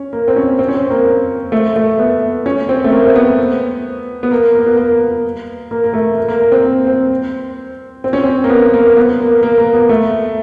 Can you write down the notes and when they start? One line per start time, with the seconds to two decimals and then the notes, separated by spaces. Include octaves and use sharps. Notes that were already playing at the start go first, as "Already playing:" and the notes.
Already playing: C#4
0.13 A#3
0.28 C4
0.36 C#4
0.59 C4
0.68 C#4
0.75 C4
0.90 A#3
1.52 A3
1.76 A3
1.99 B3
2.46 C#4
2.69 C4
2.84 A3
2.92 A#3
3.07 C4
3.16 B3
4.23 B3
4.31 A#3
4.55 A#3
4.66 B3
4.77 A#3
5.71 A#3
5.84 A#3
5.94 A3
6.18 A#3
6.28 A#3
6.40 A#3
6.52 C4
6.87 C4
8.04 C4
8.13 C#4
8.24 C4
8.44 A#3
8.49 B3
8.74 A#3
8.97 B3
9.20 A#3
9.43 A#3
9.58 A#3
9.74 B3
9.89 A3